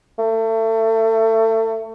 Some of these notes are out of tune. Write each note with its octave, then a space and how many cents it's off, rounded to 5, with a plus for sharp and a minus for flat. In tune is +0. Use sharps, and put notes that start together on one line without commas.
A3 +30